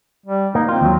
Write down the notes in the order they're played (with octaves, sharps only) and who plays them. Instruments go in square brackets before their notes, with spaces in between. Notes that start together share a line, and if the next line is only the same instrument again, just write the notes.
[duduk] G3
[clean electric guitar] A#3 [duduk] D#4
[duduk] C4 [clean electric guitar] F4
[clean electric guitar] D#2 F#3